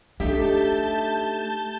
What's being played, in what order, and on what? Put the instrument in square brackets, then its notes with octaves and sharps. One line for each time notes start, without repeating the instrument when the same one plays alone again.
[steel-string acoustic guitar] A3 D#4 E5 [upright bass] D4 [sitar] G4 [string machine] A5 G6